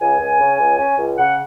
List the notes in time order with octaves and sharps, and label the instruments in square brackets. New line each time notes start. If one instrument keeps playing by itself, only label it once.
[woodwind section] C#2 G#5
C#2
C#3
C#2
C#4
C#2
C#3 F#5